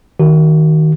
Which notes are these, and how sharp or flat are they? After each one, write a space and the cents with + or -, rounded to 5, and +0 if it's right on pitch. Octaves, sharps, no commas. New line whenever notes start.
D#3 +10 F#4 +30